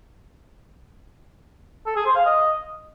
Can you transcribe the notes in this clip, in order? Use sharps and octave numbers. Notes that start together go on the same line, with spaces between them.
A4
G#4
C5
F5
D#5